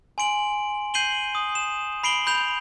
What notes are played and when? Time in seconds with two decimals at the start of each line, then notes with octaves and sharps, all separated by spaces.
0.18 G#5 C6 D7 F#7
0.94 G6 C7 D#7 F#7 G7
1.35 D#6
1.55 E7
2.03 B5 C7 D7 F#7 G7
2.27 B5 G6 F7